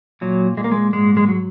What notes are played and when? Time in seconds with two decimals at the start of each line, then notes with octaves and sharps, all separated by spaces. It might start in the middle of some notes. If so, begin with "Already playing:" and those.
0.21 A#2 F#3
0.57 A#2 G#3
0.64 A#3
0.72 G#3
0.93 G#2 G#3
1.17 G#3
1.28 F#3